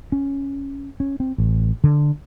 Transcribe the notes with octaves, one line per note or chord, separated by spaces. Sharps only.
C#4
C#4
C4
A1
D3